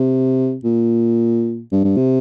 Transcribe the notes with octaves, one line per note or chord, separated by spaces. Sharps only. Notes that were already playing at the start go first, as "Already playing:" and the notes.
Already playing: C3
A#2
G2
G2
C3